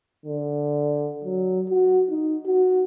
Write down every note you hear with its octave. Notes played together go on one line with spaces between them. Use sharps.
D3
F#3
F#4
D#4
F#4